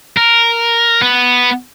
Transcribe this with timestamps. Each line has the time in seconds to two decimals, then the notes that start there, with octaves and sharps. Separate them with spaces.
0.17 A#4
1.02 B3